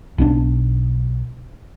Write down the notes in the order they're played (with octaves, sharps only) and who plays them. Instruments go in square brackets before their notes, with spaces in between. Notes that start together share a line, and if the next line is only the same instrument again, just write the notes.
[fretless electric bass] B1 C#4 D4